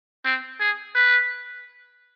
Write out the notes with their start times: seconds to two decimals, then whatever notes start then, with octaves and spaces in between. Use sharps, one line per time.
0.25 C4
0.60 G#4
0.95 B4